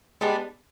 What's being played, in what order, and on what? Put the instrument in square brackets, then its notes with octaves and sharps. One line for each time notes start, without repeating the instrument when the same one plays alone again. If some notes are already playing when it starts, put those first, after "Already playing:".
[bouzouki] G3 B3 D4 [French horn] G#3